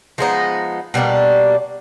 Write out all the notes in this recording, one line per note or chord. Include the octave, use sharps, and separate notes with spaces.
F3 G#3 B3 D#4
B2 G3 A#3 D4